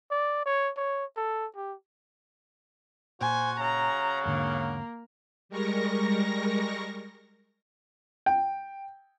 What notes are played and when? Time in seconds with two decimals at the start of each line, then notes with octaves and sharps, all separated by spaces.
0.11 D5
0.46 C#5
0.77 C#5
1.17 A4
1.55 G4
3.21 A#2 F#4 C5 G#5
3.60 C#3 A#5
4.25 E1 G#2 D3 A#3
5.49 G3 G#3 A#4 C#6 A#6
8.26 G5